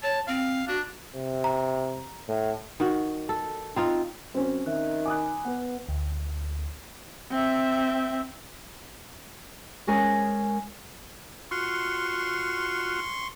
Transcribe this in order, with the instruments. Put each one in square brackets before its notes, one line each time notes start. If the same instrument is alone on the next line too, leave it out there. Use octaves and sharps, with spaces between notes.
[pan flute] C#5 [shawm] A5
[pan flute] C4 [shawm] F5
[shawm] D4 [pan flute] F#4
[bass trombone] C3
[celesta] A#5
[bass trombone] A2
[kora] D#3 F#4
A4
C4 D#4 F4
[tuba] F#2 [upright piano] C4 C#4
[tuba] D#3 [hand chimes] E5 F#6
[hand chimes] G#5 B5 [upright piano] D6 D#6 F#6
[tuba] B3 [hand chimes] B4 F#5
[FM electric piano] D2
[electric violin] C4 E5
[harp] G#3 C#4 G#4 A#4 C#5
[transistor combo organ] F4 F#4 [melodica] C6 C#6